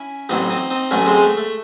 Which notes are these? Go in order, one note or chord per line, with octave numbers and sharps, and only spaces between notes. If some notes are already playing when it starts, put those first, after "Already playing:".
Already playing: C#4 E4
A1 A2 F#3 C4 D#4
C4 D#4
C4 D#4
A1 A2 F#3 A3 C#4
G#3 C4
G#3
A3
A3